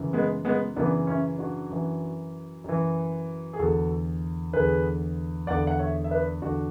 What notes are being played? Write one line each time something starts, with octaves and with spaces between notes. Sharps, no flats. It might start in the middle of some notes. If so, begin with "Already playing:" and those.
Already playing: F#2 C#3 E3
G#3 B3
G#3 B3
F#2 C#3 E3 B3 D4
C#4 E4
D4 F#4
F#2 E3
F#2 E3
G#4
E2 D3 F#4 A4
E2 D3 G#4 B4
E2 D3 D5 F#5
F#5
C#5 E5
E5
B4 D5
E2 D3 D4 F#4